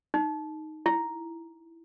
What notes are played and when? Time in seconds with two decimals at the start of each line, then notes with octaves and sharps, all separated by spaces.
0.14 D#4
0.86 E4